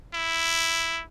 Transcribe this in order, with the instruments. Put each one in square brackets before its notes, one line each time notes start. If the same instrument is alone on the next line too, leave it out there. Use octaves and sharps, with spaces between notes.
[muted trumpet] E4